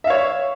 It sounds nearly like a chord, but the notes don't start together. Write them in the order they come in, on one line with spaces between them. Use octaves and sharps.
E5 F5 C#5